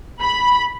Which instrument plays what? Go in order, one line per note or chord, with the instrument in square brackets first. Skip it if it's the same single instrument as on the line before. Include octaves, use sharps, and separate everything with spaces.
[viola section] B5